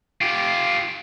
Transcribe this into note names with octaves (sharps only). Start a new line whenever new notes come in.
F4 G4